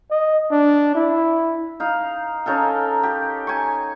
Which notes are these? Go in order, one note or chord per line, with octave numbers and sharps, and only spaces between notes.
D#5
D4
E4
D#4 F5
C#4 D#4 A4 A#4
G4
G#5 C#6